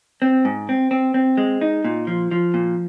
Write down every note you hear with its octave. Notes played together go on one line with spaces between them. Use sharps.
C4
G#2
C4
C4
C4
G#3
D#4
A#2
F3
F3
A#2